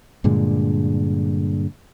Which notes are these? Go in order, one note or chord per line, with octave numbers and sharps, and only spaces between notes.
G2 A#2 D3 G#3